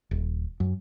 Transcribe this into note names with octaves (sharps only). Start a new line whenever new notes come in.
D#1
F#2